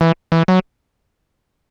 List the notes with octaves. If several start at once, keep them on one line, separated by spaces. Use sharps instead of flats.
E3
E3
F#3